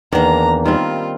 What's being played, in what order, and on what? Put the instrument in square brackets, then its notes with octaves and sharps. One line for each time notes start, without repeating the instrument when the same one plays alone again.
[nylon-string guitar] E2 [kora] D#3 [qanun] A#3 D4 [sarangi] A#5
[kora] D#3 G3 C4 [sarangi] F4